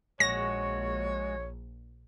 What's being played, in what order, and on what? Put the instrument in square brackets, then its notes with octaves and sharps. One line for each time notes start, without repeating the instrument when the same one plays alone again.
[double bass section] A#1 [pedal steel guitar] G#3 F#4 [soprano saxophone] C#5 [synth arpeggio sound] A#6